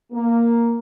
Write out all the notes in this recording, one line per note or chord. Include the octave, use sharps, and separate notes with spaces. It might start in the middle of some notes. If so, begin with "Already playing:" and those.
A#3